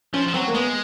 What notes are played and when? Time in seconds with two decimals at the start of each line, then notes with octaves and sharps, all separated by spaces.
0.14 F3 C#4
0.28 F3
0.34 F#3 C4
0.48 A#3
0.54 G#3 B3